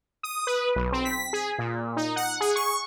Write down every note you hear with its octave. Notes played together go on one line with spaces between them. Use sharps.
D#6
B4
B1
C4
B6
G#4
A#2
D#4
F#5
G#4
C#6